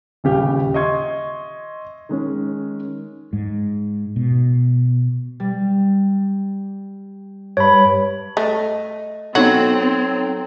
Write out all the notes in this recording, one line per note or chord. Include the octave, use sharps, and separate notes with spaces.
D#1 C#3 G4
D#5 E5 C6 C#6 G#6
D#3 G#3 C#4
G#2
B2
G3
G2 C#5 B5
A3 D#5
F#3 B3 C4 D#4 F#4 A4